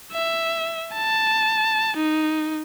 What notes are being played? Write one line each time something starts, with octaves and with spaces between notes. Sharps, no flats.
E5
A5
D#4